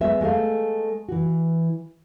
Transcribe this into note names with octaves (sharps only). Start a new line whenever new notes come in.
G#3 B3 E5
G#3 A3 G#4 F5
E3 F#4